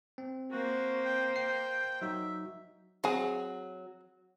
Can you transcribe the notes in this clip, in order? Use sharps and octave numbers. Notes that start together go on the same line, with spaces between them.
C4
A#3 F#4 C5
G5
G5 C7
F#3 D#4 F#4 E5
F#3 C4 G#4